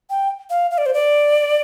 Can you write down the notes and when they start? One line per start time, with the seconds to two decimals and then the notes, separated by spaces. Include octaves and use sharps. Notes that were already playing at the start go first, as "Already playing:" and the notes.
0.10 G5
0.50 F5
0.71 F5
0.78 D5
0.86 C5
0.94 D5